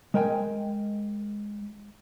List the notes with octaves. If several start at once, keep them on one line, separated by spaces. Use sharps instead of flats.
G#3 A#4 G5 G#5